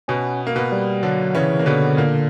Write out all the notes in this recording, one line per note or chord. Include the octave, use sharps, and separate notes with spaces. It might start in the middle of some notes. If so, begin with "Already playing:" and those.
B2 B3 C#4
A#3
B2 B3
G3
D3 F#3 D4
C#3 E3 C#4
A#3
B2 D3 B3
A#2 A#3